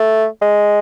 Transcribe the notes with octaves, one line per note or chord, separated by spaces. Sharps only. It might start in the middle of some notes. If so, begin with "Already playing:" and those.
Already playing: A3
G#3